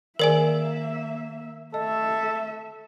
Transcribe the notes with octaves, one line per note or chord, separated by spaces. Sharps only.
D#3 A#3 G#4 A#4 D5 E5 G#5
A3 A4 D#5 E5